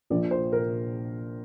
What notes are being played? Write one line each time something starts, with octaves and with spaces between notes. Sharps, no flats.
A#1 A#2 F3 A#3 D5
C5
A#4